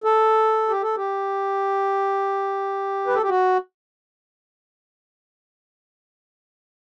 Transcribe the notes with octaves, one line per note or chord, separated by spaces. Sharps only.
A4
G4
A4
G4
B4
A4
G4
F#4